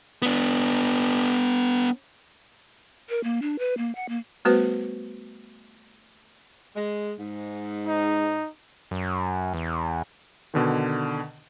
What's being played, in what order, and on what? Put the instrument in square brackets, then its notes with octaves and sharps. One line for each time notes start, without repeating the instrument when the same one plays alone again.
[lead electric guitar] B3 D4
[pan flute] A#4
A#3
D4
B4
A#3
F#5
A#3
[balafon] G3 A3 B3 F#4 B4 C5
[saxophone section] G#3
G#2
[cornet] D#4
[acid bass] F#2
E2
[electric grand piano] B2 D3 D#3